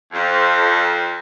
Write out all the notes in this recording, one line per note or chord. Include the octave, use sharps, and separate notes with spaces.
F2